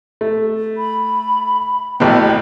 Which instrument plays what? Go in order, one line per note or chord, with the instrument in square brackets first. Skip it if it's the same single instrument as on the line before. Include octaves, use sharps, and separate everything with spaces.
[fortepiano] A3
[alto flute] B5
[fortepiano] A1 B2 B3 [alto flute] G5